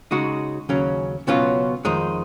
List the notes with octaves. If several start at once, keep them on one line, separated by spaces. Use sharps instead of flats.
C#3 G#3 D#4 F#4
D#2 C#3 F#3 C#4
C#2 B2 F#3 C#4 F4
F2 D#3 G#3 D#4